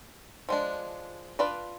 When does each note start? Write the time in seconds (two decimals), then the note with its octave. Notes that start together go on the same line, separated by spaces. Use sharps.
0.49 F3 G#3 D4
1.39 D4 F4 B4 D5